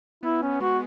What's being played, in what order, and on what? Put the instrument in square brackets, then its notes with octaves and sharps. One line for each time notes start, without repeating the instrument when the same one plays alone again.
[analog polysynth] B3 [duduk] E4
[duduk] C#4
[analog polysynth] G#3 [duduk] F#4